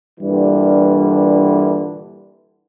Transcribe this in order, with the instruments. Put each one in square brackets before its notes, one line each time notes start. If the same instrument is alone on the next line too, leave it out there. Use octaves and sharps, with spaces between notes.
[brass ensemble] G2 A#2 D3 E3 G3